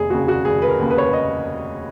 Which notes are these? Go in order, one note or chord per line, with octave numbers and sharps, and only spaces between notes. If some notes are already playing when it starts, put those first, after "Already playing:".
Already playing: F1 G#4
D#2 C#3 F#4
F#4
F1 G#4
B4
A#4
D#2 C#3
B4
C#5
B4
D#5